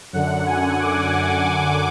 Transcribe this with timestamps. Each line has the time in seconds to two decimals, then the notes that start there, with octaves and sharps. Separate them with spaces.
0.13 F#2 D3 F#5
0.47 G#5
0.80 D6